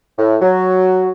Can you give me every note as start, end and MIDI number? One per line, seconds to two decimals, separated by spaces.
0.19 0.36 45
0.42 1.12 54